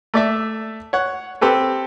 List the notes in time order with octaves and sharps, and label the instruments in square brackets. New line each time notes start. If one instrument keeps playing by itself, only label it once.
[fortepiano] A3 D5 E5
C#5 F#5
C4 G4 A4 B4